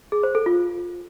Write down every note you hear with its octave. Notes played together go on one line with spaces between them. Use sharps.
G#4
C5
A4
F4